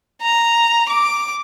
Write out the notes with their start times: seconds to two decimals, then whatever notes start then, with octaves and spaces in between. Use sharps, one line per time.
0.22 A#5
0.89 D6